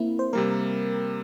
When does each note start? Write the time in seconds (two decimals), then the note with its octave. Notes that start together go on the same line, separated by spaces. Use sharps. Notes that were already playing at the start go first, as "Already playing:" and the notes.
Already playing: A#3 C4 E4
0.19 C5
0.33 C3 G3 A#3 A#4